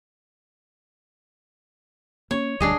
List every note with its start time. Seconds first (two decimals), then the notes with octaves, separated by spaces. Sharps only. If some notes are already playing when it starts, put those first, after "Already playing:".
2.31 A#3 C#4 C#5
2.60 D#1 D2 G3 D4 G#4 D#5